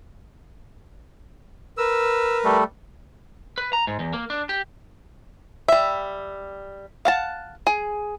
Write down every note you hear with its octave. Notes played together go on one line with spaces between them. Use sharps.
A#4 B4 E6
G3 A3 A4
B4
A#5
G#2
E2
A#3
D4
G4
G3 E5
F5 F#5 A5
G#4